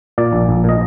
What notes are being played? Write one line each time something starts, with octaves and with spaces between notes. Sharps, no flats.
A#2 D5
A#1
A#1
A#2 D#5